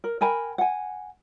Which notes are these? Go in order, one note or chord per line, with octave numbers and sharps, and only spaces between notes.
A#4
A#4 G5 G#5 B5
F#5 G#5